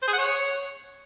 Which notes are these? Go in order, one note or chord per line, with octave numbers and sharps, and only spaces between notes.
C5
G#4
F#5
C#5